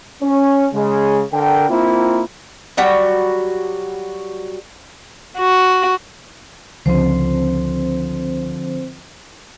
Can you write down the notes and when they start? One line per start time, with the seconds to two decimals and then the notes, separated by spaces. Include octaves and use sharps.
0.22 C#4
0.72 C#3 G#3
1.33 D3 A#4 G5
1.69 A#3 C4 E4 F4
2.77 F#3 G3 F#4 G5
5.39 F#4
6.86 C#2 D3 F3 C4 C5